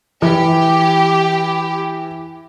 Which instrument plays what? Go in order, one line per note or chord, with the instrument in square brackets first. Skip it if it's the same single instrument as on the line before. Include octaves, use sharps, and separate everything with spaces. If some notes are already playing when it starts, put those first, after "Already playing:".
[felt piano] E3 [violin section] G4